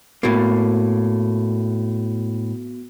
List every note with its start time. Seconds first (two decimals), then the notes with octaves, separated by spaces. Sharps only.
0.23 A2 A#3 B3 F#4